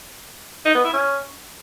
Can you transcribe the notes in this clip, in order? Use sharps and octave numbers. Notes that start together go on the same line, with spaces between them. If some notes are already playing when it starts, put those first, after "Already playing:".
D#4
B3
E4
C#4